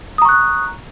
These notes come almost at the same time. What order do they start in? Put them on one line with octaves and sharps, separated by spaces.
D#6 A#5 C#6 F#6